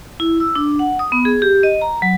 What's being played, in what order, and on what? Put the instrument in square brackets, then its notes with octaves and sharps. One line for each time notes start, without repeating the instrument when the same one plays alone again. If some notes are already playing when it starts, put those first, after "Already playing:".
[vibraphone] E4
E6
D4
F#5
D#6
B3
G#4
G4
D#5
A#5
F#3